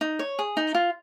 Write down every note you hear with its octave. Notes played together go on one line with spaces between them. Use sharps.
D#4
C#5
G#4
D#4
F4